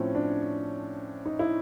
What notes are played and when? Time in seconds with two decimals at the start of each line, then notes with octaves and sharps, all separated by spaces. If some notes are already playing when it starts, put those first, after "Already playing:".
Already playing: A2 F3 C4 C#4
0.15 D4
1.26 D#4
1.39 E4